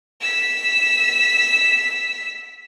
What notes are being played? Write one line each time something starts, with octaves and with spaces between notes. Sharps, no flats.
E6 B6